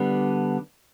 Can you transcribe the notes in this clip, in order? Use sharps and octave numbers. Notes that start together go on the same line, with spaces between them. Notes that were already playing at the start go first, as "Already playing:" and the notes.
Already playing: D3 G3 B3 D4